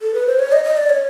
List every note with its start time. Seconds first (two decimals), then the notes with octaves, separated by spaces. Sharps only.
0.02 A4
0.14 B4
0.27 C5
0.39 C#5
0.52 D#5
0.64 D#5
0.77 D5
0.90 C#5